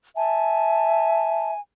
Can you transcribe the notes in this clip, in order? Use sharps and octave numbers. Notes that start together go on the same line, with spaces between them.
E5 G#5 A5